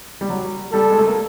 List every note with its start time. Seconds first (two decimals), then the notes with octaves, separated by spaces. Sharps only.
0.21 G3
0.30 F#3
0.72 G3 A4
0.90 G#3
0.99 A3
1.07 A#3